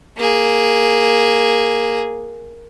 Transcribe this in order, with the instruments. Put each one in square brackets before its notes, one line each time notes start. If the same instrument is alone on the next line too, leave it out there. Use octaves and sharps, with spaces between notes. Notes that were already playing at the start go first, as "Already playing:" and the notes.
[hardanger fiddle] A#3 G#4